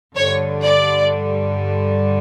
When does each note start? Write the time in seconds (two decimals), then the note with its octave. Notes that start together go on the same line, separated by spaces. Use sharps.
0.16 G2 D3 G3 C#5
0.61 D5